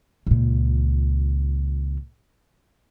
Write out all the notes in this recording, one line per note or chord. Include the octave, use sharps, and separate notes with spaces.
C#2 A#2